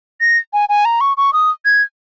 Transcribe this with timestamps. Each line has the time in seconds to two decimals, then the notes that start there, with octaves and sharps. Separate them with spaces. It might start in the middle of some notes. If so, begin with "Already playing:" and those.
0.21 A#6
0.53 G#5
0.69 G#5
0.85 A#5
1.01 C#6
1.17 C#6
1.33 D#6
1.65 G#6